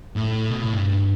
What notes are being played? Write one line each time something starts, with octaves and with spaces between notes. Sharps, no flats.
A2
B2
A2
G2